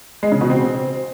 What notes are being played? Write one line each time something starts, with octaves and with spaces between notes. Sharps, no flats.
G#3
C#3
B2
C4